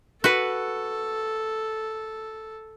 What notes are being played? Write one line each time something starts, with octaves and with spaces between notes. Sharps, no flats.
F#4 A4 B4